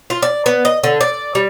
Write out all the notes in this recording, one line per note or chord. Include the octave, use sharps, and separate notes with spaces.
F4
D5
B3
D#5
D3
D5
G3